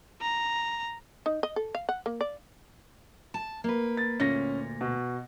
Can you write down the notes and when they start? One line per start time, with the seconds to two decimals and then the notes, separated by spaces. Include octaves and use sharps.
0.21 A#5
1.26 D#4
1.43 D#5
1.56 A4
1.75 F5
1.89 F#5
2.06 A#3
2.21 D5
3.34 A5
3.64 A#3 B4
3.97 A6
4.20 D2 A#2 C#4 A#6
4.81 B2